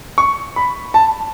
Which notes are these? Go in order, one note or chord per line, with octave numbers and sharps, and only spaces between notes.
C#6
B5
A5